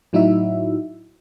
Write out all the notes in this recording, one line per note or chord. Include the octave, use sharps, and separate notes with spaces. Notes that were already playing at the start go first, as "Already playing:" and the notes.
A2 F#3 D#4 E4 F#4 E5